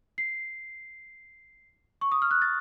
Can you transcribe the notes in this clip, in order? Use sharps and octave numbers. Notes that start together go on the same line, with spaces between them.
C7
C#6
D#6
F6
F#6
A6